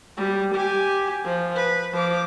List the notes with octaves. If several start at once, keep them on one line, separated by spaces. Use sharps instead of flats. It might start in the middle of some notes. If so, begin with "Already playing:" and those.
G3
G4 G#5
F3
B4
F3 D6